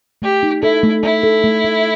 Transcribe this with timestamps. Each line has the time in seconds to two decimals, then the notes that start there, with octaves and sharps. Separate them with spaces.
0.22 A3 G4
0.43 D#4
0.63 E4 A4
0.83 A3
1.03 A3 E4
1.23 A4
1.44 A3
1.64 A3